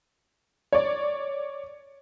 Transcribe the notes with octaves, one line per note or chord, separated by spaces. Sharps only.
C#5 D5